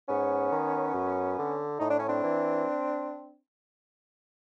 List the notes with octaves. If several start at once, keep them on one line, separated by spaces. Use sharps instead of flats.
G#2 B3 C#4
D#3
F#2
D3
A2 D#4
D4
C#4
C4 D4
E3